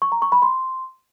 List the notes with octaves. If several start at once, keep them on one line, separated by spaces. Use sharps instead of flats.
C#6
A#5
C#6
B5
C6